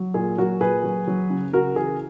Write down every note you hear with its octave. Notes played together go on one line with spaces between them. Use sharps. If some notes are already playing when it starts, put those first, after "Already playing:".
Already playing: F#3
A#2 G#4
F#3 F#4 A#4
A#2 G#4 B4
F#3
F#3
C#3
C#3 F#4 A#4
E3 G#4